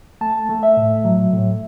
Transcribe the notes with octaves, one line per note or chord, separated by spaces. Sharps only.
A3 A5
A3
E5
A2
F#3
A2